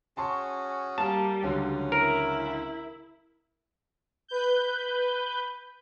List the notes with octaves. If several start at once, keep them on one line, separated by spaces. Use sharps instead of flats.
C#4 F#4 G#4 A5 C6 C#6
G3 A#3 A5
C#2 D3 F#3 C#4
E4 A#4
B4 G6